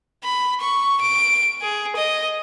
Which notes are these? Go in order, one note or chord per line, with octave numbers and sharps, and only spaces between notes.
B5
C#6
D7
G#4
D#5